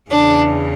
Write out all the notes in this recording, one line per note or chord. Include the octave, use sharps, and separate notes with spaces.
E2 C#3 E3 D4